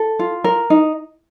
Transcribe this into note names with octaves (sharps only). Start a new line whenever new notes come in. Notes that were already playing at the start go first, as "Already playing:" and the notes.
Already playing: A4
F4
A#4
D#4